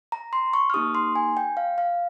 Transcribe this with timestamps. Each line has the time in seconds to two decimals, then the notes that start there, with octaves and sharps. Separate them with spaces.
0.12 A#5
0.33 C6
0.54 C#6
0.70 F6
0.74 A#3 D#4 G4 D#6
0.95 C6
1.16 G#5
1.37 G5
1.57 F5
1.78 F5